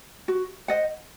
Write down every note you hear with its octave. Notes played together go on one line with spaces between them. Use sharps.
F#4
C5 D#5 F#5